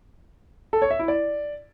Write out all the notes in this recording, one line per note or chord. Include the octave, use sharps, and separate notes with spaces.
A4
C#5
E5
E4
D5